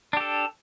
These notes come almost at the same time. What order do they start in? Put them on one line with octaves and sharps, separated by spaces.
D4 G4 A4